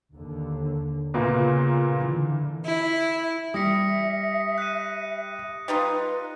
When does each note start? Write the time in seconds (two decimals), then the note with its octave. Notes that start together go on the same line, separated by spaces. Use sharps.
0.15 D#2 D3
1.14 A#2 C#3 A#3 B3
1.98 D3 E3
2.66 E4
3.54 G3 E5 D#6 A#6 C#7
4.58 F#6 D#7
5.68 G3 D#4 F4 B4